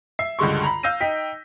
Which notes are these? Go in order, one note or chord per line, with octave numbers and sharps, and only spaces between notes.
E5 C7
C#2 G2 D3 G#3 C6 C#6
A#5 B5
F5 E6 G6 A#6 D#7
D#4 G5 B6